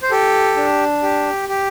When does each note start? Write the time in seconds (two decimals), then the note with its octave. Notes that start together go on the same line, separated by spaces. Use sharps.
0.03 C5
0.11 G4 A4
0.57 D4
1.03 G4
1.49 G4